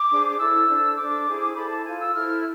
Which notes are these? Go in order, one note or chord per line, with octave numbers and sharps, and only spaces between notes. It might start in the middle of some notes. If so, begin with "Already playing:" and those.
Already playing: D6
D4 G#4 C5
D6
E4 A4 C5 E6
D4 A4 C5
D4 A4 C5 D6
E4 G#4 C5
E4 A4 C5 B5
A5
F4 A4 C5 G#5
E6
E4 A4 C5 F6